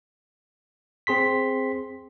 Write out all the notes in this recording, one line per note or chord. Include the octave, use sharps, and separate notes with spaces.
C4 G#4 C6 B6